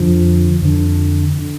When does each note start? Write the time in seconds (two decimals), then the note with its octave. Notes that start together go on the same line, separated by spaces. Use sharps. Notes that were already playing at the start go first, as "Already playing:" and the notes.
Already playing: F2 D3 F3
0.62 F2 D3
1.39 D3